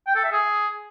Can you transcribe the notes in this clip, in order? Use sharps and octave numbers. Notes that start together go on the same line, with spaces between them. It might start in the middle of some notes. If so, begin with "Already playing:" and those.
G5
A4
E5
G#4